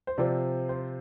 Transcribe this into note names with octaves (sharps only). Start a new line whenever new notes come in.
C5
C3 F3 C4 D5
C5